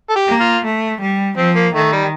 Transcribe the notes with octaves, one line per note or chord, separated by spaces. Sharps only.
A4
G4
A#3
F4
A3
G3
F3 C4
A#3
D#3 A3
G3